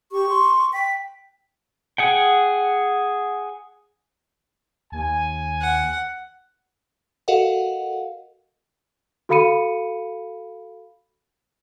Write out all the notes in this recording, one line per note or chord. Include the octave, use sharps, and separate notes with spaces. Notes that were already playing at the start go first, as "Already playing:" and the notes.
G4 C#6
C6
G5 B6
G#4 F#5 G5
D#2 G#5
F#5
F#4 A4 A#4 D#5 F5 F#5
F#4 A4 F5 B5 C#7 D#7